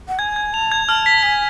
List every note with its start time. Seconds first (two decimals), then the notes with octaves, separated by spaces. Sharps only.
0.08 F#5
0.19 G#5 G#6
0.36 G#6
0.53 A5 F7
0.72 G#6
0.88 A5 F6
1.06 B6
1.23 G#5 B6